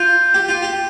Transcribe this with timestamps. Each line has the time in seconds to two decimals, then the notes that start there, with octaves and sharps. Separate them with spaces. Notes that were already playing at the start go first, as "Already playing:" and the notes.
Already playing: F4 G6
0.34 G4
0.49 F4
0.62 G4